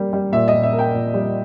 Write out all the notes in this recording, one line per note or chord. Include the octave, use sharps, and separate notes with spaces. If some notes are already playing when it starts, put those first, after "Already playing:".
Already playing: G3 A#3
G3
A#2 E5
D#5
A#2
E5
A#3
G5
A#2
G3